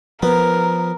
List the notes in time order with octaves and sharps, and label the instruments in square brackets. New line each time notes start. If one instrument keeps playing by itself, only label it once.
[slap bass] F3 [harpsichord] B3 [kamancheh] A#4